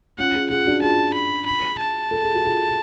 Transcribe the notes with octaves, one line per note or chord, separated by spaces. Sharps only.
C#4 F4 F#5
F4 G#4
F4 G#4 F#5
D4 F#4
F4 G#4 A5
B5
B5
A5
A4
G#4
F#4
F4 G#4